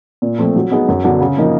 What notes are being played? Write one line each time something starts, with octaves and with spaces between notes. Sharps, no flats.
A#2
F3 A3 C4
F#3
B3 D#4 G#4
F#2
D3 F#3 B3 D4
C#3
F3 A#3 D#4